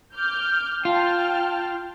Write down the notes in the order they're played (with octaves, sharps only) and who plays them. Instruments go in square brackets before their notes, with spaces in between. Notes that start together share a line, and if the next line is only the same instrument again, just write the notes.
[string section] D6 F6 G6
[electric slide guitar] F4 [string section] G5 A5 F6